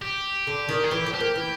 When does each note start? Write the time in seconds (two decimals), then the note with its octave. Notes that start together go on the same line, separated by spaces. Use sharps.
0.02 G4
0.47 D3
0.69 D#3
0.84 G#4
0.90 E3 G4
1.06 F3
1.14 G4
1.20 A#3
1.36 E3